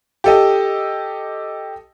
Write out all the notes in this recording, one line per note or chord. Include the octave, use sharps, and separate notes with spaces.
G4 A4 D#5